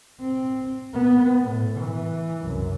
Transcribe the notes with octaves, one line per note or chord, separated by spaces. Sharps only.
C4
B3
A2
E3
C2 F#2